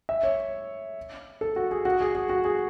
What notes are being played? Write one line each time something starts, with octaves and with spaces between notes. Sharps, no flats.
E5
C#5
A4
F#4
G#4
F#4
G#4
G#4
F#4
G#4